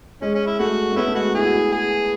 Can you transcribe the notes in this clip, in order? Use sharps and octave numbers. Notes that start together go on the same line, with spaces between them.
G#3 C#4
C#4
E4
A3 F#4
A3
B3 C#4 E4
A3
G#3 F#4
E4 G#4
F#4
E4
G#4